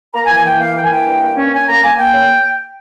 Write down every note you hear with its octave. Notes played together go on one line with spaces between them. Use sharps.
A#3 A#5
G#5
E3
G#5
E3 G5
A#3 F5
A#3 G5
G#5
E3 G5
G2
A#3
C#4
C#4 G#5
A#3 A#5
A#3 G#5
A#3 G5
C#3